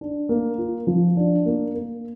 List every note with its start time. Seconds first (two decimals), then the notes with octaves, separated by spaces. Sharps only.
0.01 D4
0.29 A#3
0.58 F4
0.87 F3
1.17 D4
1.46 A#3
1.74 A#3